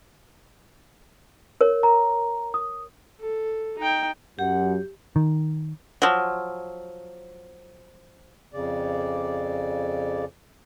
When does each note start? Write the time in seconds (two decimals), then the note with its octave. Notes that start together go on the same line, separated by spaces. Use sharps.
1.61 A#4 C#5
1.83 A#5
2.54 D#6
3.20 A4
3.79 D#4 G5
4.39 F#2 F#3 G4 F#5
5.16 D#3
6.02 F3 F#3
8.53 F2 C#3 D5